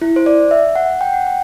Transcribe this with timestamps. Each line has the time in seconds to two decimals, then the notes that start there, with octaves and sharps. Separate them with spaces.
0.02 E4
0.16 C5
0.26 D5
0.51 E5
0.75 F#5
1.01 G5
1.13 F#5
1.27 G5